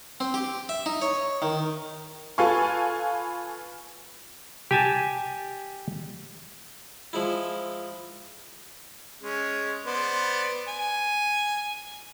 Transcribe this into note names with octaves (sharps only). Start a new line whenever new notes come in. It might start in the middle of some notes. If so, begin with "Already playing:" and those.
C4
G4
E5
D#4
C#5
D#3
F4 A4 B4 F5 G#5 C#6
G4 G#5 A5
F3 G#3 E4
G#3 C#4
B3 C5 D5
G#5